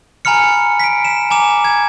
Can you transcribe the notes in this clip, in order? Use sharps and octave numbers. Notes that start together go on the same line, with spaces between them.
G#5 A#5 B5 F6 C#7
B6 D7
E7
G#5 A#5 D6 E7
G#6